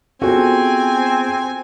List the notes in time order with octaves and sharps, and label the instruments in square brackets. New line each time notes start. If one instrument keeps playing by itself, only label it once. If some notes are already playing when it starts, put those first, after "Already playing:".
[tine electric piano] B3 F4 G#4 [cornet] C4 [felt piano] F#4 A4 [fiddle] G#5